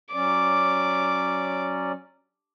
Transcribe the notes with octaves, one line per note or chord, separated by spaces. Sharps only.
F#3 C#4 D5 D6